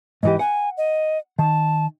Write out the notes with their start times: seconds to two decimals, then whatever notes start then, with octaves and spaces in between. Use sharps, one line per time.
0.23 G#2 E3 G4 D#5
0.39 F#5 G#5
0.77 D#5
1.39 D#3 A5